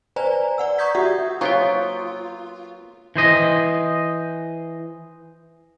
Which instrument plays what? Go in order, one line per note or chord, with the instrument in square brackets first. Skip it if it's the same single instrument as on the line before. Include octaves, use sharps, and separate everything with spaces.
[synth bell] B4 C5 D5 G#5 A#5
D5 F#5 E6
A#5 C#6 D#6 G6 G#6 B6
F#4 G4 E5 F#5
[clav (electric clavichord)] F#3 B3 G5 [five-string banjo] A#3 C5 C#5 [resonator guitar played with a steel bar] F4 [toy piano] C#6
[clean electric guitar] E3 C5 D#5